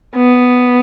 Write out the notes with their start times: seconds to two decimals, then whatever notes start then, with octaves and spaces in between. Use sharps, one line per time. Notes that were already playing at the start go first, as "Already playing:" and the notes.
0.16 B3